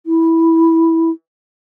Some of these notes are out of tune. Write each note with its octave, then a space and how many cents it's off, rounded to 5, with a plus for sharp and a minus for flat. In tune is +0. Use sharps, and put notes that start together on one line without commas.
E4 -10